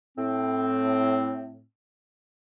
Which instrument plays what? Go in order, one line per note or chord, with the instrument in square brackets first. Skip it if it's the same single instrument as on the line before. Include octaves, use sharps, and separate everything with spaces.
[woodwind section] A2 C4